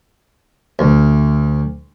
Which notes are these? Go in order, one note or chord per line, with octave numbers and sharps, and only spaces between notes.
D2